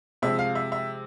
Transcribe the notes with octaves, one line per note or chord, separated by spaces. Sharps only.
C3 F3 G#3 E5
F5
E5
E5